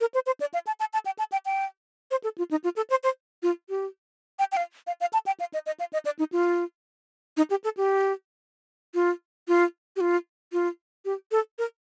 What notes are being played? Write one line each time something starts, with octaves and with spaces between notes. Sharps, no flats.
A#4
C5
C5
D5
F5
A5
A5
A5
G5
A5
G5
G5
C5
A4
F4
D#4
F4
A4
C5
C5
F4
G4
G5
G5
F5
F5
F5
A5
G5
F5
D#5
D#5
F5
D#5
D5
D#4
F4
D#4
G4
A4
G4
F4
F4
G4
F4
F4
G4
A4
A#4